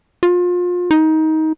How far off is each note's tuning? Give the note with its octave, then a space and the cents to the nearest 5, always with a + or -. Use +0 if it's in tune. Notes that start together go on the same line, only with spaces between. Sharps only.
F4 +30
D#4 +20